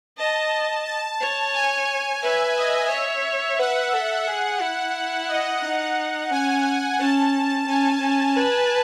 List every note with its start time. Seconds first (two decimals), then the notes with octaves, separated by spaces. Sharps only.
0.18 D#5 A5
0.86 A5
1.20 C#5
1.54 G#5
2.22 B4 E5
2.56 D#5
2.91 C#5 E5
3.59 B4 F#5
3.93 A4
4.27 G#4
4.61 E4
5.29 D#5
5.63 D#4 F#5
6.31 C#4 G#5
7.00 C#4 A5
7.67 C#4 G#5
8.02 C#4
8.36 B4